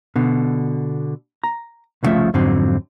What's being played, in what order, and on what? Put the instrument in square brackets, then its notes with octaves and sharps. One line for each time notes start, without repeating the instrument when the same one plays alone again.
[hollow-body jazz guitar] B2 D3
A#5
C2 A2 C#3 F3 A3 E5
F2 G#2 D3 F#3 C4